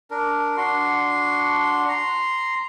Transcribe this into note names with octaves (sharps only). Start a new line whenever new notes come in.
D4 A#4
D4 F#4 C6
A#5 C6